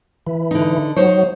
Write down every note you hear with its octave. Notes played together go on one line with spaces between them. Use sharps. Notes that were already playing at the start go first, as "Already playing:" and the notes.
E3
D3 D#4
F#3 D#4 C5 C#5